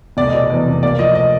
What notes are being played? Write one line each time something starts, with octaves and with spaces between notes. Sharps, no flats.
F1 D5
D#5
B2 D5
E2
F1
A#3 D5
F3 D#5
D#5